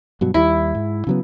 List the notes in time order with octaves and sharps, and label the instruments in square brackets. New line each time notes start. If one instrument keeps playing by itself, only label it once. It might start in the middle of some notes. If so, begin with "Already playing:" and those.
[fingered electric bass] G2 B2 F#3
[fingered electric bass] D#2 G3 [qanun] E4
[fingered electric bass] G#2
C#3 F#3 B3